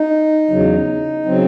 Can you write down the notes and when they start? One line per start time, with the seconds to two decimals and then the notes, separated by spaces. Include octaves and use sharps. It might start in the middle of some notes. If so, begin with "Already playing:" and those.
Already playing: D#4
0.50 E2 C#3 F#3
1.25 C#3 F#3 C4